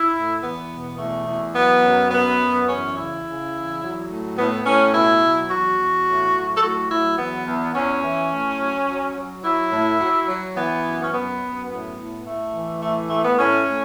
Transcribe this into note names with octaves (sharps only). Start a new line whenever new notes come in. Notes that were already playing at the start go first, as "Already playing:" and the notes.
Already playing: E4
A2
E2 B3
B2
E2 A3
E2
F#3 B3
F#2
F#2 B3
F#2
E2 C#4
C#3 E4
C#3
E2
F#3
A2
A2 B3
A2 C#4
B2 E4
F#3
E2 F#4
E2
A2
F#3
A4
A2 F#4
F#3 E4
E2 B3
E2
E2 C#4
E3
A2
F#3
F#3
F#3
F#3 E4
A2
F#3
F#3
E3 B3
F#2
C#4
F#2 B3
F#2
A2 B3
A2
A2 A3
E3
A2 A3
A2 A3
B3
A2 C#4
A2